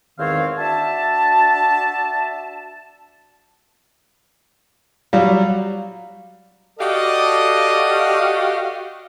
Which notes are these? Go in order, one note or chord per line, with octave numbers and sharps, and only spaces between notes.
E2 G#2 D#3 C4 C#5 F5
D4 F#4 E5 A5
F#3 G3 F5
F#4 G4 A4 D5 D#5 F5